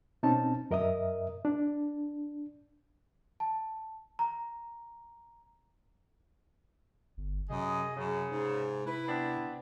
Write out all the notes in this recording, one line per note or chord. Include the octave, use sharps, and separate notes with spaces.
B2 C4 C#4 D#4 A5
F#2 A#4 D#5 E5 D#6
D4
A5
A#5
G1
F#2 C3 G#4 D#5
F#2 C#3
G#2
E4 B4
B3 C4 D4